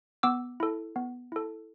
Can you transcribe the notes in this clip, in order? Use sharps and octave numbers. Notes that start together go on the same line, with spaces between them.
B3 D6 E6
E4 A4
B3
E4 A4